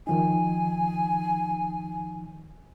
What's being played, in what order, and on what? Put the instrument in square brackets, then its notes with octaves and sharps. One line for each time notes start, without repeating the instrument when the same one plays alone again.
[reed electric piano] D#3 F3 D#4 [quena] G#5